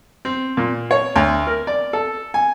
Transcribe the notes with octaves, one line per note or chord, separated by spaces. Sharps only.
C4
A#2
C#5
D2
A#4
D5
A4
G#5